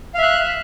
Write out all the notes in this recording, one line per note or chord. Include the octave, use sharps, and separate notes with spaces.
E5 F5 F#6